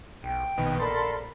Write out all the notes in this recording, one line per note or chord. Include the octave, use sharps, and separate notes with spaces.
B1 G5
A#1 B2 D#3
A4 A#4 D5 B5 C6